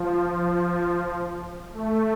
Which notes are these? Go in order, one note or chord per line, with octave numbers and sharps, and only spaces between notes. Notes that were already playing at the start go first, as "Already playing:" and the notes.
Already playing: F3
F3
A3